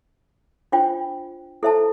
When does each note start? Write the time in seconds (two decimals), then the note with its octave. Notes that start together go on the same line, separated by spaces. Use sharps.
0.72 D4 F4 C5 G5
1.63 E4 A4 C5 E5 A5